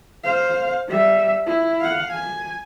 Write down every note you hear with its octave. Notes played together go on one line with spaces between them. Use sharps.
C5 F5
G3 E5
E4
F5 F#5
G#5